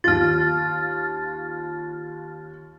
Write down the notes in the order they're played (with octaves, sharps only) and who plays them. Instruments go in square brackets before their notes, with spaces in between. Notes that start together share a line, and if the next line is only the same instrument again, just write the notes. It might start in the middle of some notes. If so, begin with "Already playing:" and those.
[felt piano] D#2 F4 [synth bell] F6 A6